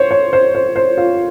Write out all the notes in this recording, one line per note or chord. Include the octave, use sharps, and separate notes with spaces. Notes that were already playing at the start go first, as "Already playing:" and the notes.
Already playing: C5 C#5
C#5
C5
C5
C5
F4